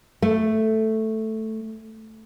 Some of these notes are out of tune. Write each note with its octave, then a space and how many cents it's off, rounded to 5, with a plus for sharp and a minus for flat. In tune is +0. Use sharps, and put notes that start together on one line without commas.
A3 +0